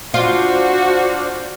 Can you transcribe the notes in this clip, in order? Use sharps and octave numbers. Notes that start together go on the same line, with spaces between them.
D4 F4 F#4 C5 F5